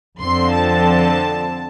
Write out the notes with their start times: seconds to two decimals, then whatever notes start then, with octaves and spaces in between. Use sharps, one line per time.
0.20 F2 D3 F3 C4 C6
0.53 A5